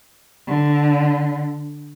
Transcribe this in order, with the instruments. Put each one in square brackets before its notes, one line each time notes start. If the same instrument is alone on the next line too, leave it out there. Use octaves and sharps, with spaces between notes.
[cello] D3